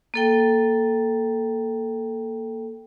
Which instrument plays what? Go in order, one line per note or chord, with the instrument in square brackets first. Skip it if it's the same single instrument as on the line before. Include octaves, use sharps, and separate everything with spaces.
[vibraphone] A#3 A4 G5